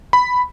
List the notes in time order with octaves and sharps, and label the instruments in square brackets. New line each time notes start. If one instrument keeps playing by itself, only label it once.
[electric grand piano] B5